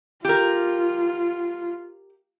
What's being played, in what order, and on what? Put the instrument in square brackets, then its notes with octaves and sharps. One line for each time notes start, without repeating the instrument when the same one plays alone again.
[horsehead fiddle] F4 [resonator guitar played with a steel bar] G4 A#4